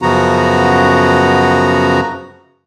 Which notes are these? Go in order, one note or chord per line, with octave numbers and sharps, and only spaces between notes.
F#2 C#3 F3 B3 F#4 A#5